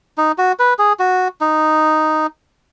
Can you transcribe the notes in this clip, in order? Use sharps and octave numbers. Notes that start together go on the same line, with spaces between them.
D#4
F#4
B4
G#4
F#4
D#4